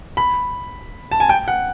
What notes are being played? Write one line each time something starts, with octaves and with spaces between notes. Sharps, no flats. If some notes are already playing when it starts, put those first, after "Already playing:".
B5
A5
G#5
G5
F#5